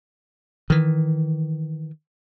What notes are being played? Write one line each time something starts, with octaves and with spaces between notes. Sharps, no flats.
D#3 E3